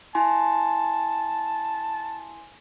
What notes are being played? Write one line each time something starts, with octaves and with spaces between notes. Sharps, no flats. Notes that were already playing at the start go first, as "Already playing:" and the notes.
E4 G#5 A5 C6